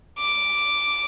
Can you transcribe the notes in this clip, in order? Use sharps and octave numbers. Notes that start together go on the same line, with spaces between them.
D6